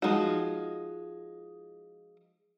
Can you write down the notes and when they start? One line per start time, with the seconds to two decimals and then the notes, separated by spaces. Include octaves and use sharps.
0.02 F3 G#3 D#4 F#4